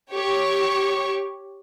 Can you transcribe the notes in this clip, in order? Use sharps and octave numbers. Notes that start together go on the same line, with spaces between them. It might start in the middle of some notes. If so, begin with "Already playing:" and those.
G4 C#5 C#6